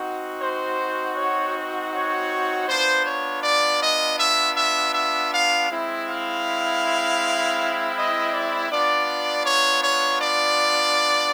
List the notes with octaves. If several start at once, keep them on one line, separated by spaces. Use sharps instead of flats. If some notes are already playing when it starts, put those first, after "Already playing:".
Already playing: C4 D#4 F#4
C5
C#5
C#5
B3 D4 F4 C5
C#5
D5
D#5
E5
E5
E5
F5
G#3 C4 E4
F5
D#5
D5
B3 D4 F4 D5
C#5
C#5
D5